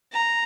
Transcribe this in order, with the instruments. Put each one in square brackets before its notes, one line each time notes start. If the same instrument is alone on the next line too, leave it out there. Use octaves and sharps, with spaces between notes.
[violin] A#5